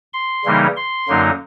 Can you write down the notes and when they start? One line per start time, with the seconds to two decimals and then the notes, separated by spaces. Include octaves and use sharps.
0.13 C6
0.45 C#3 E3 G3 A#3 D#4
0.76 C6
1.08 F#2 D3 F#3 A#3 D#4